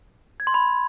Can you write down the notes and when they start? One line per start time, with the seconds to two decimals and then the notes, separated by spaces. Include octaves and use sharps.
0.40 G#6
0.47 C6
0.54 B5